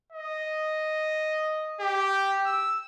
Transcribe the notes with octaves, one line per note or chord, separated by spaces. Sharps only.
D#5
G4
E6